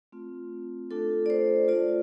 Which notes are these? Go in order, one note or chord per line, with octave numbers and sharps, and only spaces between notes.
A3 C4 F4
A3 D4 F4 A4
D5
C5
F4 D5
A3